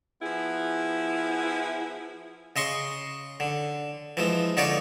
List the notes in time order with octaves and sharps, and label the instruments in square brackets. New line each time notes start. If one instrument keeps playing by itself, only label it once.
[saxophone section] F3 B3 E4 G#4
[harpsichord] C#3 D#5 C6 C#6
D3
E3 F3 G#3
D3 D#4 F4 C#5 D5